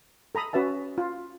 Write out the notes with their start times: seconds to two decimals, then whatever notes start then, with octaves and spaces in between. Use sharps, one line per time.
0.35 A4 A#5 B5 D#6
0.53 C#4 F#4 B4 E5 A5
0.98 F4